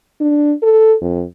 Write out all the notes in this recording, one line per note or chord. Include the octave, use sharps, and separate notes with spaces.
D4
A4
F2